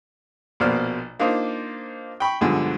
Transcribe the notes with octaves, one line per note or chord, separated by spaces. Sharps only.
A#1 B2 A#3 C5 D5 F6
A#3 D4 D#4 F4 C5
G5 B5 C#6
B1 G2 D3 F3 G#3